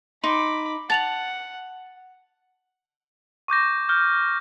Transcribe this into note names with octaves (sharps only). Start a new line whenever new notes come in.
D#4 B5 C6 D6
F#5 A5 A6 F7 F#7
C#6 D6 G6 A#6
F6 G6